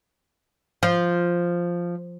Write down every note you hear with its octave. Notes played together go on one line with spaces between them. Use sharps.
F3